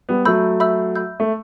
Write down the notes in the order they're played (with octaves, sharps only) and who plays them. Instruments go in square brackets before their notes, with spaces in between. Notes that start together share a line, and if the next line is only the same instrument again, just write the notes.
[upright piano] G3 B3
[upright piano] F#3 A3 [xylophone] E5 B5 E6 G6
[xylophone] E5 B5 E6 G6
E5 B5 E6 G6
[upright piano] A3